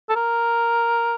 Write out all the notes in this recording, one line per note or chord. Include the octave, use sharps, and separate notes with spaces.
A4
A#4